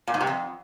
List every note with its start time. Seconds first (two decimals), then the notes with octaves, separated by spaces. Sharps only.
0.07 A#2
0.14 G#2
0.21 C3
0.27 F2